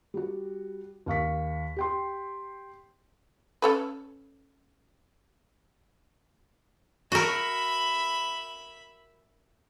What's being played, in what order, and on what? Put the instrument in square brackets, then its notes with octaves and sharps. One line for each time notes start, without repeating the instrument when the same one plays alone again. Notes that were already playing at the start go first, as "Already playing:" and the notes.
[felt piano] G3 F#4
D#2 F5 C#6 B6
G4 G5 C6
[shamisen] C#4 A4 B4
[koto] F#4 A#4 [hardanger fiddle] E5 B5